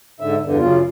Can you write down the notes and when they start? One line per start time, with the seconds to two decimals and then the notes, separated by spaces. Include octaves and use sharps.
0.20 G#2 D3 E5
0.43 E2 G2 D3
0.58 F#2 C#3 F4